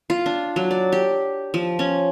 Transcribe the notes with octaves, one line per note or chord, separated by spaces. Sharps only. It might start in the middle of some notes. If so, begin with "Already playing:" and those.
F4
D4
F#3
D5
G4
F3
C#4